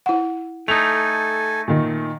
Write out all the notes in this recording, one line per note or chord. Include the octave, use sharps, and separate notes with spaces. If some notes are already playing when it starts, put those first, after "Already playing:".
E4 F#5
A3 D#4 A4 G#5 F7
A#2 D#3